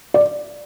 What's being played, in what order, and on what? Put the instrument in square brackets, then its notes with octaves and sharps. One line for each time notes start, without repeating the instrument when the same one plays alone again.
[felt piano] D5